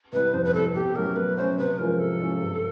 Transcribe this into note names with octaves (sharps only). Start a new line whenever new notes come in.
C3 E3 G3 B4
F2 C5
B4
C3 E3 G3 A4
B2 G4
F#3 A3 C#4 A#4
B2 B4
F#3 A3 C#4 C5
C3 B4
F3 G#3 C#4 F4 A#4
C3 A4
F3 G#3 C#4 F4
G2